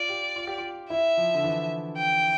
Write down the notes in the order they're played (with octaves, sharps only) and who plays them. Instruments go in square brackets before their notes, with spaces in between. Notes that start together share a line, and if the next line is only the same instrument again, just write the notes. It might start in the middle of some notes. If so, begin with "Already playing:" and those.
Already playing: [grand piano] F4 [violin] D5
[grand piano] G4
F4
G4
F4
[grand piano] E4 [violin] E5
[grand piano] F3
D3
E3
[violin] G5